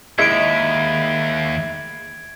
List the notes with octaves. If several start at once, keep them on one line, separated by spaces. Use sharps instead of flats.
D#2 G#3 E4 E5 G#6 D7